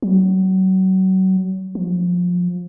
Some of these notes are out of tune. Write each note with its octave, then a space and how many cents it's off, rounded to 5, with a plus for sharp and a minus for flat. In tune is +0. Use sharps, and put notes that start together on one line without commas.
F#3 +30
F3 +25